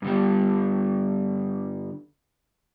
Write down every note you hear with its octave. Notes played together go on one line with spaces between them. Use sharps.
G2 D3 G3